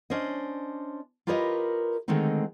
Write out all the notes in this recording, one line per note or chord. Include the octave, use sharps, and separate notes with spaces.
C#4 D4 C5 C#5 D#5
F4 G4 A#4 B4 C#5 D#5
D3 D#3 G#3 A3 C4 D#4